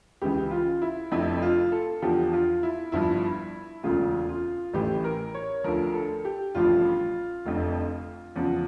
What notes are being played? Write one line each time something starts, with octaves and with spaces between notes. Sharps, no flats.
C#2 C#3 E3 G4
F4
E4
F1 F2 D3 E4
F4
A4
E2 D3 F3 G4
F4
E4
G1 G2 F3 E4
E1 D2 C#3 F4
F4
A1 A2 E3 G4
A#4
C#5
D2 D3 F3 A#4
A4
G4
A1 G2 D3 F3 F4
F1 F2 D3
E2 C#3 F3